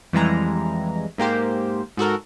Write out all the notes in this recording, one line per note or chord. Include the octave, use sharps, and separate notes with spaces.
F2 E3 G3 G#3 A#5
G#2 A#3 G4 C5
G#2 F#4 A4 A#4